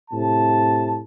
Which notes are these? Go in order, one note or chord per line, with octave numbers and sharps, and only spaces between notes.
A2 C3 A5